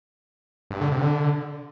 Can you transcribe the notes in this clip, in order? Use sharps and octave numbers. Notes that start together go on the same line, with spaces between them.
G2
D3
C3
D3